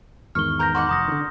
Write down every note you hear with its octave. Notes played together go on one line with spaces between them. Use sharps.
E2 G#2 D#3 C#6 F6 G7
B3 A#4 A#5 G6 A#6
F#4 D5 F#5 C6
F1 A#5 D#6 A#6
D3 D#3